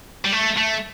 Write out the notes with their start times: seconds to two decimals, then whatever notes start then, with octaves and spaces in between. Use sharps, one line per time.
0.25 G3
0.33 A3
0.57 A3